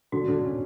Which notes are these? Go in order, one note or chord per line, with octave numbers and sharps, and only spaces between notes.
D3 F#4
D3
C#4